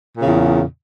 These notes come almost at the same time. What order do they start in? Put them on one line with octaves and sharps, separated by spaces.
A#2 C#3 E2